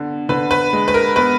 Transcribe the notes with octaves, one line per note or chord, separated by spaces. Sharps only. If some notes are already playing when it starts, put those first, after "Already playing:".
Already playing: D3 B3
D3 B4
B4
G#3
B4
A#4
B3 B4